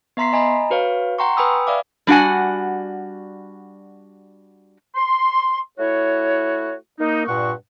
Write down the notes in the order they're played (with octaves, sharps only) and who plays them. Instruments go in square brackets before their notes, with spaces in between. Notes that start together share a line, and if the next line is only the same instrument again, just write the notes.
[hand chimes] B3 E5 A#5 C6 B6 C7
D#5 G#5 A#5 B5
F#4 B4 C#5 F5
F#5 G5 A#5 C6 C#6
B4 G5 G#5 B5 D#6 E6
D5 E5 F5 D6
[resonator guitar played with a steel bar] G3 D4 F#4 F#5 G#5
[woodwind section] C6
A3 E4 F#4 C#5
A#3 D#4
G2 A#2 F#5 C#6